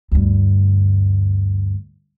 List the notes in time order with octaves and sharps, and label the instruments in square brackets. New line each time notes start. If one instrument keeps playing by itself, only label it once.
[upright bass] D2 G2